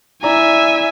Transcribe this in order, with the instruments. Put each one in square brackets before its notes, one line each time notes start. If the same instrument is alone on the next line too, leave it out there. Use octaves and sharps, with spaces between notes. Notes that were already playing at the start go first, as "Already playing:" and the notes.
[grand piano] E4 D5 A#5 [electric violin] E5 G#5